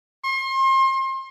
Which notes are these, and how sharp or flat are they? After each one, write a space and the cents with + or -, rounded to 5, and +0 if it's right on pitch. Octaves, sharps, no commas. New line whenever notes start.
C6 +35